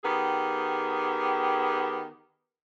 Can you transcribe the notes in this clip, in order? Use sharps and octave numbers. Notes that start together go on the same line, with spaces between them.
D#3 B3 G4 G#4